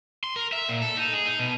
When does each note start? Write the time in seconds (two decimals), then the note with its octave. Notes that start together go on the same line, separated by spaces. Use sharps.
0.24 C6
0.36 A#4
0.53 E5
0.69 A#2
0.82 A4
0.97 D#4
1.13 G#4
1.26 D#4
1.39 B2